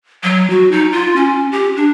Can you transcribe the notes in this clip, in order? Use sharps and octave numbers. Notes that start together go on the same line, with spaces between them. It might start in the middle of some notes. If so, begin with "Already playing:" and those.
F#3
F#4
D#4
F4
C#4
G4
D4